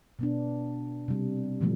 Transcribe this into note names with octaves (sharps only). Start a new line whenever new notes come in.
B2 B3 D4
C3 G3
A#2 D3 E3 F3 G3 A3